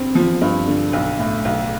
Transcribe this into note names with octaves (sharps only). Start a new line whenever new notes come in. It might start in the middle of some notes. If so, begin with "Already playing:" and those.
Already playing: G2 D3 C4
F3
G2
D3
B1
A2
B1